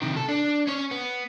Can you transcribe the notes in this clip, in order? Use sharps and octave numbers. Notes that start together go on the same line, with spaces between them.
C3 D#3
A4
D4
C#4 C#5
B3